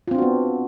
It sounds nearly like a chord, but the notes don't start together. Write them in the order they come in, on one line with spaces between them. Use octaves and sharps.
F4 C4 D4 F#4 B3